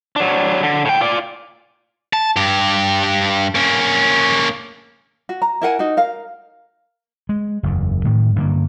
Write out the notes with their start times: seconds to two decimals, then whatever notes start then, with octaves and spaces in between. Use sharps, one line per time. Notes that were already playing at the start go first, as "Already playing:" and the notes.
0.16 F#3 D4
0.63 D3
0.85 A2 G5
1.01 F4 D5
2.13 A5
2.36 G2 G4
3.55 A#3 C#4
5.29 F#4
5.42 A#5
5.62 E4 A#4 F#5 G#5
5.79 D#4 F#4
5.97 A#4 F5
7.29 G#3
7.63 F#1 E2
8.05 A2 D#3
8.36 G2 D3 G3 A#3